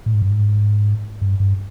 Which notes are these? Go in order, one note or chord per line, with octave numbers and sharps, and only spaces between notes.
A2
G#2
G2
G#2
G2
G2